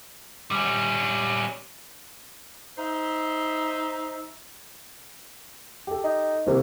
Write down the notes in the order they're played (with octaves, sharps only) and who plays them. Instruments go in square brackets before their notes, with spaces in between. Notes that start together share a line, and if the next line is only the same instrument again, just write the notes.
[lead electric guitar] G3 C#4
[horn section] D#4 C5 E5
[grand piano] G4 A4
[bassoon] D#4
[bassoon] C2 [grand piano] C3 A#3